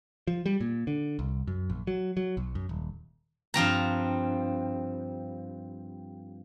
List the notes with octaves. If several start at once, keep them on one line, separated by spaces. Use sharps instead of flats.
F3
G3
A#2
D3
C2
F#2
A#1
F#3
F#3
B1
F#2
D#1
G2 F3 C4 A#5